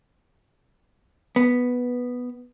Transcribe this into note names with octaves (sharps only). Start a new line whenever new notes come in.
B3